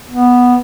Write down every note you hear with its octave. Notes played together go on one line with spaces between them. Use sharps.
B3